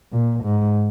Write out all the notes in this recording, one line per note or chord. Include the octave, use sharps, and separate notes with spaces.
A#2
G#2